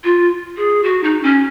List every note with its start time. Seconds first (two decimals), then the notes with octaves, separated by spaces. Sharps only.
0.04 F4
0.57 G#4
0.84 F#4
1.04 D#4
1.23 C#4